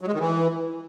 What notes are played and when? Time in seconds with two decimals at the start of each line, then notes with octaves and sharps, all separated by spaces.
0.01 F#3
0.07 G#3
0.14 D#3
0.20 E3